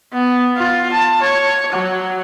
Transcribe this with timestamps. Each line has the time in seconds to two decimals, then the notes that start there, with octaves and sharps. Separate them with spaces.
0.13 B3
0.57 F4
0.92 A5
1.21 C#5
1.73 F#3